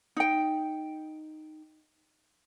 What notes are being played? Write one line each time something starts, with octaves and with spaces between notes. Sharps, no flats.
D#4 G5